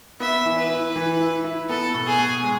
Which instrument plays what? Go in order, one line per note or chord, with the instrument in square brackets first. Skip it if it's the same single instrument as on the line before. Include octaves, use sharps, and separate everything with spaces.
[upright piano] B3 [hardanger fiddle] E5
[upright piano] E3
[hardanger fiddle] B4
[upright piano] E4
E3
E4
E4
[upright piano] B3 [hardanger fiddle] A4
[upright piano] B2
[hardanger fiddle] G#4
[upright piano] B2
G#3